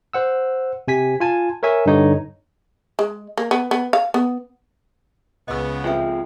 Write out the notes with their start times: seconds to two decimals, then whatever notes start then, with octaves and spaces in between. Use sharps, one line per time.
0.13 C5 F#5 E6
0.88 C3 G#5 B6
1.20 F4 G#5 A5
1.63 A#4 C#5 E5 G#5
1.86 G2 D3 D#4 C#5
2.99 G#3
3.38 A#3
3.51 B3
3.71 B3
3.93 F5
4.14 B3
5.48 C#2 C#3 B3 D#5 E6
5.84 F3 G#3 C4 C#5 E5